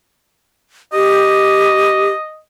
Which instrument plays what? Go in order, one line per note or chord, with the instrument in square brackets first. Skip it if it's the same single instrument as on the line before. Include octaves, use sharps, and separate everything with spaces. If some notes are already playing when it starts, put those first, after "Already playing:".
[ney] G4 [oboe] D#5